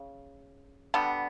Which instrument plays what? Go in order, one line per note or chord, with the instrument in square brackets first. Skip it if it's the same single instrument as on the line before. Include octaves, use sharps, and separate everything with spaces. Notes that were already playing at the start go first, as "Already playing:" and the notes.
Already playing: [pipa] C#3
D3 G3 B3